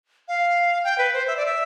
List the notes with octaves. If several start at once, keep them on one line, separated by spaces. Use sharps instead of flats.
F5
G5
B4
C5
E5
D5
E5